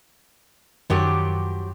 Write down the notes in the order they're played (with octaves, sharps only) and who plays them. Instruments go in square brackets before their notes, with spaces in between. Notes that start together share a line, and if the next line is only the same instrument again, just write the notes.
[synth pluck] F#2 D#3 [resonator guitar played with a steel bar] F3 F#3 G4